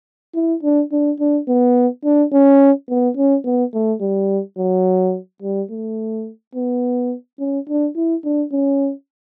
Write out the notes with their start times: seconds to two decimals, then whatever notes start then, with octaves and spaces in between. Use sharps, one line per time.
0.35 E4
0.63 D4
0.92 D4
1.20 D4
1.48 B3
2.04 D4
2.33 C#4
2.89 B3
3.17 C#4
3.45 B3
3.74 A3
4.01 G3
4.58 F#3
5.42 G3
5.71 A3
6.55 B3
7.40 C#4
7.69 D4
7.96 E4
8.25 D4
8.52 C#4